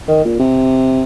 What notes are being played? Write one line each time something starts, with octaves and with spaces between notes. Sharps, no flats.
D#3
A#2
C3